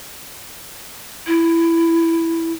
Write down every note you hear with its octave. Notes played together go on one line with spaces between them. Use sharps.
E4